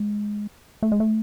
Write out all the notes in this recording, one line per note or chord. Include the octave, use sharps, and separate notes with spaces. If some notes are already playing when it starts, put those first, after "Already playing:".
Already playing: G#3
A3
G#3
A3